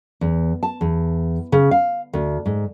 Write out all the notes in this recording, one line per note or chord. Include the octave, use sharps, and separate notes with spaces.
E2
A5
E2
C#3
F5
D2
G#2